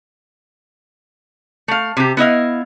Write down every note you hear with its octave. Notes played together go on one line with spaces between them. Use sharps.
A3 F5
C3 G4
B3 E4 D#5 F5